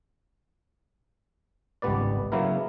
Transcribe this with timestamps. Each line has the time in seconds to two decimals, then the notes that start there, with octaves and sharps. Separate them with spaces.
1.82 G#1 C#2 G3 B3 B4 D5
2.32 C#3 F#3 A#3 B3 E4 A#4